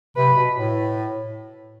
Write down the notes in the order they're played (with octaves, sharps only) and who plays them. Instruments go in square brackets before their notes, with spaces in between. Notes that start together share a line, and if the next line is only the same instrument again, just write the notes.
[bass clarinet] C3 [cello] B4
[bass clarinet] B2
A2